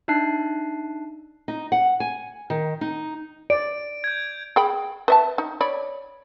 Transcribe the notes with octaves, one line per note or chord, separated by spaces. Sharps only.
D4 D#4 E5 A5 F#6 C7
D#4
F#5
G#5
D#3
D#4
D5 D7
G6 G#6
G#4 G5 B5
B4 E5 A5
D#4
C#5 D5 B5